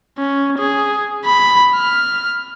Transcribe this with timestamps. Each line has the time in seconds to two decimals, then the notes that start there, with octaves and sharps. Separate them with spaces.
0.18 C#4
0.58 G#4
1.25 B5
1.75 F6